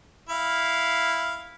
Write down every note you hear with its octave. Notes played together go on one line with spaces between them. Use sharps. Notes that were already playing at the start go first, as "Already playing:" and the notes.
E4 F5